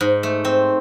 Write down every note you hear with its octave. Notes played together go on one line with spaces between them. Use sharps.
G#2
A3
C4